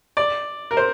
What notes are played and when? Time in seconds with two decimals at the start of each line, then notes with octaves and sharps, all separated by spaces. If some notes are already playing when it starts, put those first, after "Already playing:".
0.17 D5
0.71 A#4
0.77 C5